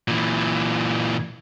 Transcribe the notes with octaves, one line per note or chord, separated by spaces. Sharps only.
A#2 E3